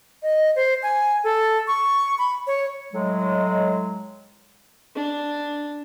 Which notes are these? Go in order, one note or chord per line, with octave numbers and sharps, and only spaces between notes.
D#5
C5
G#5
A4
C#6
B5
C#5
A2 F#3 G#3
D4